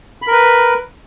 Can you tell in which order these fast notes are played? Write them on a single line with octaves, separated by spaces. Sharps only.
B5 A#4 B4